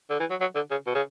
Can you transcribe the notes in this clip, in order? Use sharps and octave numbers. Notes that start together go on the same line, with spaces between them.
D3
E3
F#3
F#3
D3
C#3
B2
C#3